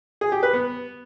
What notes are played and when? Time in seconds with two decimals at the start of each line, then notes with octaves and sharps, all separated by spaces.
0.21 G#4
0.32 G4
0.43 B4
0.53 B3